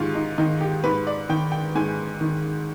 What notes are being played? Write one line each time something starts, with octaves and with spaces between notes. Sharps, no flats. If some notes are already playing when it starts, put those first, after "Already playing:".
Already playing: G#2 D#3 F4 G4
D#4
D#3 D#4
G4
G#2 B4
D5
D#3 G5
G5
G#2 G#5
D#3